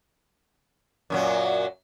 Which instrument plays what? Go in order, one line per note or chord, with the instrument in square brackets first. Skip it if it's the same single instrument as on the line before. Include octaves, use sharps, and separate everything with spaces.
[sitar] F#2 A#2 F#3